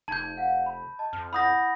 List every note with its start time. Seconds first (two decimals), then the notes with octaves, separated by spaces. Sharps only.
0.08 F1 D#4 A5 G6 G#6
0.37 F5 F#5
0.66 B5
0.99 D#5 A5
1.13 F2 F6
1.33 E4 F#5 B5 D#6 G6 A#6